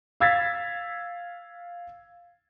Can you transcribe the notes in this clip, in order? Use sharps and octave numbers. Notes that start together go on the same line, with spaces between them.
F5 E6 G#6 A6 B6